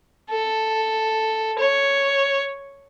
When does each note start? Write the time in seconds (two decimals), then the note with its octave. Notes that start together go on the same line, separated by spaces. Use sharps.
0.30 A4
1.59 C#5